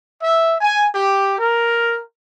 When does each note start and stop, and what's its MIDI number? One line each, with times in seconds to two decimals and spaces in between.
0.23 0.55 76
0.61 0.86 80
0.95 1.35 67
1.39 2.00 70